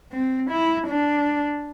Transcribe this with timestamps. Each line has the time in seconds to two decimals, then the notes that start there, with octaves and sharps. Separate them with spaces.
0.13 C4
0.51 E4
0.88 D4